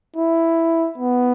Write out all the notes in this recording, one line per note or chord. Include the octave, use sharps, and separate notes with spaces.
E4
B3